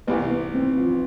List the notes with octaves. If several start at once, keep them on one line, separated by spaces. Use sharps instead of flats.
C2 C3 E3 B3
B3
C4
F3